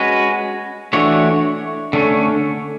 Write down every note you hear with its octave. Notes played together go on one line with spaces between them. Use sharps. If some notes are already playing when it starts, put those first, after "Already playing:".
Already playing: G#3 C#4 F#4 B4
E3 A3 D4 F#4 C#5
D3 A3 C#4